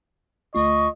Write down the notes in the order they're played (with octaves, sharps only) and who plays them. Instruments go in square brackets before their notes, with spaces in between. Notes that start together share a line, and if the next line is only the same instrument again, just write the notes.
[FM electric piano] D2 A3 F4 [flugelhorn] D#5 [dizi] C#6